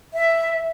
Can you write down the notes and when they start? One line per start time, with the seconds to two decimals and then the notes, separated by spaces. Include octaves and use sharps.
0.14 E5